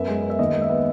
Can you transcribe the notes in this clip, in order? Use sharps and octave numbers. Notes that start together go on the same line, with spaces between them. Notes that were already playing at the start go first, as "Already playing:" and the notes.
Already playing: F#2 B3 E5
G#3
B3
E5
D#2 D#5
G#3
E5
B3